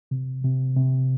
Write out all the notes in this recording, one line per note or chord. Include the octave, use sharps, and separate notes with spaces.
C3
C3
C3